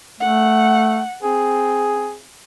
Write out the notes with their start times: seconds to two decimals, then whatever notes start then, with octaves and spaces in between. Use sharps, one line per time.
0.20 A3 F#5
1.23 C4 G#4